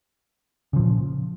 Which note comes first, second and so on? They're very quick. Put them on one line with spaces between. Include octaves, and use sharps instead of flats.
C#3 F3 A#2